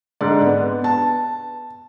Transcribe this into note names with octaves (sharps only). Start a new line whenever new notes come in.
G#2 D3 D5
B3
A5